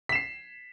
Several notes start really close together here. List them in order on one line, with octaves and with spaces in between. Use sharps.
B6 E7 C7